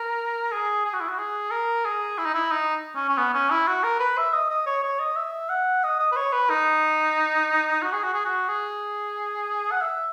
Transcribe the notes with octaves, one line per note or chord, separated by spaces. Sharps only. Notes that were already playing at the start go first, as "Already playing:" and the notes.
Already playing: A#4
G#4
G#4
F#4
E4
F#4
G#4
A#4
G#4
E4
D#4
E4
D#4
C#4
C#4
B3
C#4
E4
F#4
A#4
B4
E5
D#5
D#5
C#5
C#5
D#5
E5
F#5
D#5
D#5
B4
C#5
B4
D#4
F#4
G#4
F#4
G#4
F#4
G#4
F#5
E5